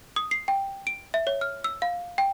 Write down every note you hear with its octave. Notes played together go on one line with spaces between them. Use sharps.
D#6
C7
G5
D7
E5
C#5
F6
E6
F5
G5